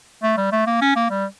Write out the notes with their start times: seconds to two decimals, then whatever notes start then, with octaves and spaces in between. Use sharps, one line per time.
0.23 A3
0.38 G3
0.52 A3
0.67 A#3
0.82 C#4
0.96 A#3
1.10 G3